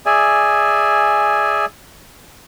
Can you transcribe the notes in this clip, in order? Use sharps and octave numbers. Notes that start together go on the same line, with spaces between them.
G#4 D5 E5 G#5